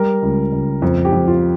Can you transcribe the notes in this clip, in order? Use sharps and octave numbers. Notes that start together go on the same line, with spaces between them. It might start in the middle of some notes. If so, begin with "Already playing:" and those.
Already playing: G3 A#4
C#2
C#2
F2
G4
F2
F4